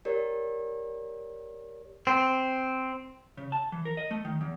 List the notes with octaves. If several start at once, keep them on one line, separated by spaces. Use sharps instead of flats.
G4 A#4 C#5 D5
C4
C#3
A5
E3
A#4
D#5
A3
D#3
E2